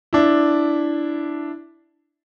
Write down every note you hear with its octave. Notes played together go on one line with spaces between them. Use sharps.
D4 E4